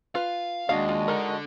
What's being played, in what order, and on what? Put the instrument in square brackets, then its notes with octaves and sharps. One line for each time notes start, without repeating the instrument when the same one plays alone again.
[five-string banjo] F4 B4 [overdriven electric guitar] F5
[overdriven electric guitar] D#2 [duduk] G#3 [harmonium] D4 F#4 D#5 [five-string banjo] F5
[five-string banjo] F4
[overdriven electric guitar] D3 [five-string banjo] D#4 A#4